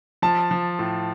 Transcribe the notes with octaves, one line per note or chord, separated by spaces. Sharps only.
F3 A5
F3
A2